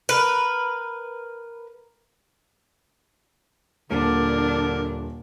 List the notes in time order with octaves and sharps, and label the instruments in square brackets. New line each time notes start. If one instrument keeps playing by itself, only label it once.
[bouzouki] A#4 B4
[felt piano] D#1 [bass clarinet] D3 [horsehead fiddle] D4 [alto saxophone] A#4